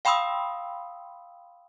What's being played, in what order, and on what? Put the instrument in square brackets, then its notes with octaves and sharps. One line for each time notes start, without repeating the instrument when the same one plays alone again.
[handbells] F5 G5 B5 C6 D#6 E6